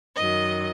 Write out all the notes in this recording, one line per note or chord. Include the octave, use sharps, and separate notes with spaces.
F#2 D#3 F#3 D#5